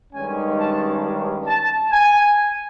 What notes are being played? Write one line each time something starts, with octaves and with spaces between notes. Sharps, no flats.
G2 D#3 G#3 C#4 G#5
A5
A5
G#5